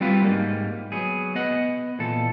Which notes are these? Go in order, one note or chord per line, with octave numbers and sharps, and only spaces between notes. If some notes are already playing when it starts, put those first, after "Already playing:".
G3 C4 F4 F#4 B4 F5
G#2 G3 A#3
F#3 B3 G#4
B3 D#5 F#5
A#2 E3 A4